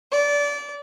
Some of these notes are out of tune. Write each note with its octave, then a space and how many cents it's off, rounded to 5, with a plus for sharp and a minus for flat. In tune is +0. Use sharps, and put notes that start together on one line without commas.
D5 -25